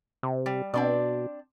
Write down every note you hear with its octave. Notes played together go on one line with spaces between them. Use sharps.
C3
G3
B2 C4 D4 D5